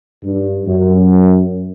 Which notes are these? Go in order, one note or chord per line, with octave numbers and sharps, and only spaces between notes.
G2
F#2